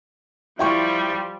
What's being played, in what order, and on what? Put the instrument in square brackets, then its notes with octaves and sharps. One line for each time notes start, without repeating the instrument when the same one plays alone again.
[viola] F3 G3 [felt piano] E4 G5 C#6